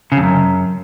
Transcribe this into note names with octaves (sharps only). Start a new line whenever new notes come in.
C#3
F2
F#2